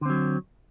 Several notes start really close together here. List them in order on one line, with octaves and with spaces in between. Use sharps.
D3 C4 F#3